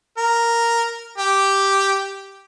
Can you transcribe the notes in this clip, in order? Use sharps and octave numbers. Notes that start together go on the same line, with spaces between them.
A#4
G4